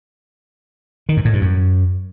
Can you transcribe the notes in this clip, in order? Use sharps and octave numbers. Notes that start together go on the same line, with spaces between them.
D#3
G#2
A2
G2
F#2